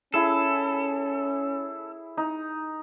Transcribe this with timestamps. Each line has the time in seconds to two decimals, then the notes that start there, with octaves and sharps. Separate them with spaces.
0.14 C#4 E4 G#4 A4
2.17 D#4